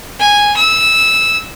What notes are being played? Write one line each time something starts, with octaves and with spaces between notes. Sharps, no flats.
G#5
E6